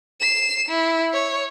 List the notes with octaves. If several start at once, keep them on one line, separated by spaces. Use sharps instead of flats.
C7 E7
E4
C#5